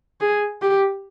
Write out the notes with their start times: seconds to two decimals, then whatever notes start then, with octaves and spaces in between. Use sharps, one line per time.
0.21 G#4
0.62 G4